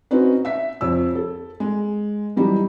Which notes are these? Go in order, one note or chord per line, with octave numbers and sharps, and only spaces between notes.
C4 C#4 D#4 F#4 B4
E5 B6
F2 C#5 E6
A4
G#3
E3 F#3 G3 D#4 G4